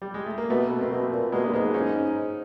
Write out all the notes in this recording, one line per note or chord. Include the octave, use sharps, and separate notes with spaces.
G3
G#3
A3
A#3
B2 A3 B3
B2
A#3 C4
B2
A#2
B2 G#3 A#3
G2 B3
G#2 G#3 A#3
C#4 D#4